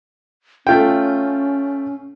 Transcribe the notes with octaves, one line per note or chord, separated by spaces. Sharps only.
A3 C#4 F4 G5